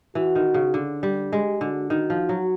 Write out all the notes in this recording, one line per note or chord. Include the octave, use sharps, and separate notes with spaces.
E3 F#4
D#3
C#3
D3
G3
G#3 G4
D3 F#4
D#3 F#4
F3
F#3